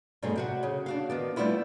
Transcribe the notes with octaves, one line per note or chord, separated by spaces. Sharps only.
G2 B2 F#3 A3 C4 G#4
C3 F#4 F#5
C#3 G#4
D4 F#4 F5
D#3 B3 D5
G3 A3 B3 D4 E4 F4